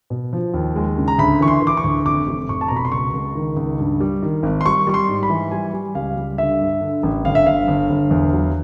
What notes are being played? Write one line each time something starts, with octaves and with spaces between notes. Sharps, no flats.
B2
F3
D#2
G#3
C#3
A#5
D2 B5
E3 C#6
C6
E3
D6
C#6
D2
F1 D6
F1
F1 C#6
A5
B2 A#5
B5
C6
C#2 C#6
C#2
D#3
C#2
G2
G3
D#3
G#1
C6
G3 C#6
G3 C#6
C6
G#2
B5
E3
G3 G#5
G3
C#2 F5
G3
D3 E5
G2
D3
A1
G1 F5
E5
G1 F5
G1
G1
E2
F#3